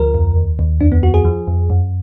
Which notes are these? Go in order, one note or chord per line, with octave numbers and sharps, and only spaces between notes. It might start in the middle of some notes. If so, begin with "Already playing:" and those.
Already playing: D2 F3 A#4
F2
D#2
D#2
F2 D4
B3
F2 F#4
G#4
F3
F2
F#2